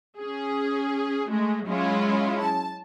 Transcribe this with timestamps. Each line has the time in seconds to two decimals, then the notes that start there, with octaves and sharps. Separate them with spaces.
0.20 C#4 G#4
1.28 G#3 A3
1.66 F#3 G#3 C#4 E4 F4
2.41 A5